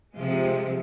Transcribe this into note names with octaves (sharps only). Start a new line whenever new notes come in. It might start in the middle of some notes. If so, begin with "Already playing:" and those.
C3 F3 G#3